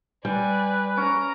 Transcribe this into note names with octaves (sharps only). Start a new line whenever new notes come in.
G3 B4 D5 G#5
C#4 A#5 D7